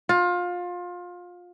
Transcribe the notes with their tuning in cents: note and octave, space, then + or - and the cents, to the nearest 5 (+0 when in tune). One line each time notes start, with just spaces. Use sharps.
F4 +25